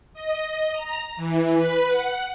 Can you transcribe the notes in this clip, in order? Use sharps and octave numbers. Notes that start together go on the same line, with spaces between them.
D#5
A#5
E3
B4
F#5